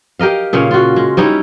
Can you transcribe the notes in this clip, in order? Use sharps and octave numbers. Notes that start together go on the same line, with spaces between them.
G4 A#4 D#5 F5
A#2 C#3 C#4 F5
F4 F#4
G#3
G3 C#4 D#4 E4